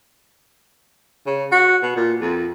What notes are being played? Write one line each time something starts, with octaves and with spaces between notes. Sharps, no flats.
C#3
F#4
B2
A#2
F2